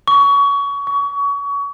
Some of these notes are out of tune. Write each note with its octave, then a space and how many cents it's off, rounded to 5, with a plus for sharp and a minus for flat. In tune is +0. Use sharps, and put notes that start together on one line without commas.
C#6 +25
C#6 +30